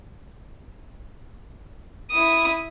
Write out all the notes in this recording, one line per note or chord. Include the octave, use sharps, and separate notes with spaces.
E4 D#6